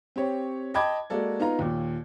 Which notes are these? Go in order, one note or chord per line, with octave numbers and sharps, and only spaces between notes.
C4 G4 C#5
D#5 G5 A5 B5 D6 G#6
G#3 A#3 F#4 A4 D5
B3 D#4 F4 A#5
D#2 A#2